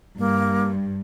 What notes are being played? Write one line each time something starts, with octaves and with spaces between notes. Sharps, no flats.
G2 A#3